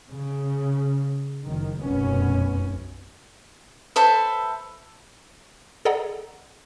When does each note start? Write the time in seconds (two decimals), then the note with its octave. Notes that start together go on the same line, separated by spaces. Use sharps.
0.11 C#3
1.45 F#1 D#3
1.82 F1 B1 F#2 B3 C#4
3.96 A4 B4 C5 E5
5.85 G#4 A4 D5 D#5 F#5 A#5